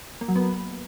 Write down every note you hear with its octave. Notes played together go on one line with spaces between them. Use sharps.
A#3
F#3
B3